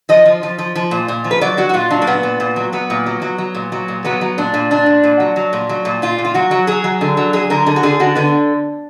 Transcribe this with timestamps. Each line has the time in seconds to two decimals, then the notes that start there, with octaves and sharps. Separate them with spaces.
0.09 F3 D#5
0.25 F3
0.43 F3
0.58 F3
0.75 F3
0.91 A#2
1.08 A#2
1.24 F3
1.31 B4
1.41 F#3 D5
1.57 F#3 F#4
1.69 F#4
1.73 A#2 F4
1.90 F#3 D4
2.02 A#3
2.07 A#2 B3
2.23 A#2
2.40 A#2
2.56 F#3
2.73 F#3 B3
2.90 A#2
3.06 F#3
3.22 F#3
3.38 F#3
3.55 A#2
3.72 F#3
3.88 A#2
4.04 F#3 B3
4.21 F#3
4.38 A#2 D4
4.54 A#2
4.71 A#2 D4
4.86 A#2
5.04 A#2
5.20 F#3
5.36 F#3
5.53 A#2
5.69 F#3
5.85 A#2
6.02 A#2 F4
6.18 A#2
6.25 F4
6.34 F#3 F#4
6.51 F#3
6.67 F#3 G#4
6.84 F#3
7.01 D3
7.17 F#3
7.33 F#3 G#4
7.50 D3 A#4
7.66 D3 G#4
7.76 F#4
7.83 D3 G#4
8.00 D3 F#4
8.15 D3 B3